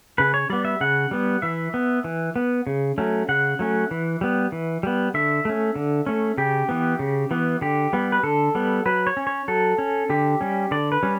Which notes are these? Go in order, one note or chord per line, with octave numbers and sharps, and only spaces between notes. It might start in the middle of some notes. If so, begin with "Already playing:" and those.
C#3 B4
C#5
G3 B3 D5
E5
C#3 F#5
G3 B3
E3 E5
B3
E3
B3
C#3
F#3 A3 C#4
C#3 F#5
F#3 A3 C#4
E3
G3 B3
E3
G3 B3
D3 E5
A3 C#4
D3
A3 C#4
C#3 G4
E3 B3
C#3
E3 B3
D3 G4
G3 B3
B4
D3 A4
G3 B3
F#3 B4
C#5
C#4
C#5
F#3 A4
C#4
D3 G4
G3 C#4
D3 D5
B4
G3 C#4